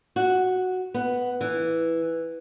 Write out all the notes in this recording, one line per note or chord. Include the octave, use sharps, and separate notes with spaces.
F#4
B3
E3